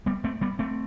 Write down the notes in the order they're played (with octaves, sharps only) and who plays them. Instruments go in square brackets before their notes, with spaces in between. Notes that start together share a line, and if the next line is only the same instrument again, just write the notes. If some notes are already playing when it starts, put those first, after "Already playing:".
[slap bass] G3 B3
A3 C4
G3 B3
A3 C4